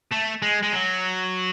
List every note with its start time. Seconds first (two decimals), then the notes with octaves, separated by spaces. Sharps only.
0.12 A3
0.42 G#3
0.63 G#3
0.72 F#3